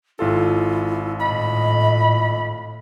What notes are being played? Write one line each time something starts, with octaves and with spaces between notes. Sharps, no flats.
G#1 E4 F4 A4
A2 D#5 B5